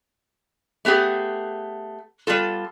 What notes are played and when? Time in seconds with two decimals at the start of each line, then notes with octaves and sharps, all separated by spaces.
0.85 A3 B3 G4 G#4
2.27 G3 B3 F4 A4